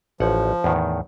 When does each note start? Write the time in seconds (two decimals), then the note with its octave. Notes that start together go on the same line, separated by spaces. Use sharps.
0.20 A1 F3 F#5
0.64 E2 A2 D#3